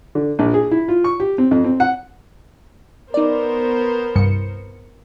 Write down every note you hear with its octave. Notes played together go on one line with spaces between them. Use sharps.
D3
A#1
G#4
E4
F4
C#6
G4
C4
F2
C4
F#5
B3 D#4 A#4 C5 D5
C2 G2 C#7